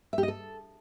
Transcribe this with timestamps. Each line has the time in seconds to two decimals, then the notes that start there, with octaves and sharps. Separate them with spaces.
0.13 E5
0.18 G4
0.23 D#5
0.28 A4